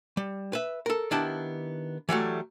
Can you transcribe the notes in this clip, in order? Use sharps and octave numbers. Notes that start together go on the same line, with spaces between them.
G3
B4 E5
A4 A#4
D#3 B3 D4 E4 G4 A5
E3 F#3 G3 A3